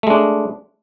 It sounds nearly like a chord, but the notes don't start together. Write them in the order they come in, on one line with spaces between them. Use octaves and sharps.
A3 G#3 D4